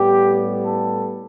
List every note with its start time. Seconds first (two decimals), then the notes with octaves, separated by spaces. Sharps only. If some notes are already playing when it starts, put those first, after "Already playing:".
Already playing: A2 G3 B3 G4
0.64 A4